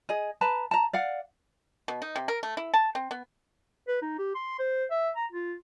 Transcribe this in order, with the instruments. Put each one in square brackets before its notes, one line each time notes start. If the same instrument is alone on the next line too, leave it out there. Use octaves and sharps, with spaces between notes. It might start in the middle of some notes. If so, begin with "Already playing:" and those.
[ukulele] G#4 D#5
B4 A5 A#5
A5 A#5
D5 F5 F#5
[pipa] B2
D#4
C3
A#4
A3
E4
A5
C4
B3
[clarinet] B4
D#4
G4
C6
C5
E5
A#5
F4